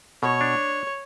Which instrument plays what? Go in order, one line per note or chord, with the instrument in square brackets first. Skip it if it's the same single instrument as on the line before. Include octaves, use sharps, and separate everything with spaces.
[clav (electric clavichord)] B2 [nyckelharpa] C#5
[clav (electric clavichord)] D4